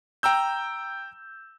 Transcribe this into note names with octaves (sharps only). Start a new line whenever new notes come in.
G5 A#5 E6 G6